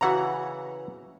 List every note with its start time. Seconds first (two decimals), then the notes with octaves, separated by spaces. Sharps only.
0.01 C#3 E3 F#4 E5 F#5 A#5